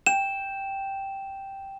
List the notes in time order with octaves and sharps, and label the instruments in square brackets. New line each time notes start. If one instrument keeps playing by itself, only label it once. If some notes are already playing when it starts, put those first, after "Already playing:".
[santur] G5 [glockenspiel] E7